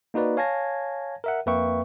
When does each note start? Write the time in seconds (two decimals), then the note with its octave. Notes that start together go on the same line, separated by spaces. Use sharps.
0.14 A#3 D#4 F#4 B4 D5
0.37 C#5 F5 G#5 A5 G#6 A#6
1.24 A#4 E5 F#5
1.46 F2 A#3 B4 E5 G5 C#6